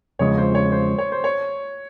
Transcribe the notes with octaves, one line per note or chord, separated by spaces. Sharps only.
E2 C#3 F3 G#3 C#5
C5
C#5
C5
C#5
C5
C#5